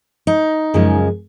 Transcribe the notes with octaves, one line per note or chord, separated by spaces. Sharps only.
D#4
F#2 C#3 F3 G#3